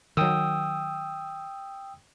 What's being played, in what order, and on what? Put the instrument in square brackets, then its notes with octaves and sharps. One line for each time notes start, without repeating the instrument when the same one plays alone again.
[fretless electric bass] D#3 F#3 [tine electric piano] G5 D#6 E6